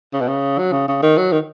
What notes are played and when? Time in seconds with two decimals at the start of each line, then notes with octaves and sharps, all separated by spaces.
0.13 C#3
0.21 B2
0.28 C#3
0.58 F#3
0.72 C#3
0.88 C#3
1.02 D#3
1.17 F#3
1.32 D#3